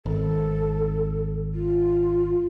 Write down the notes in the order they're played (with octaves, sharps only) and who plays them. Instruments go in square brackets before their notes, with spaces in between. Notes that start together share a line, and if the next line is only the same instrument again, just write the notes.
[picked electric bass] G#1 [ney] A4
[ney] F4